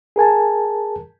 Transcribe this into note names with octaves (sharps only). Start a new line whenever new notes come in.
G#4 A#4 G#5 A5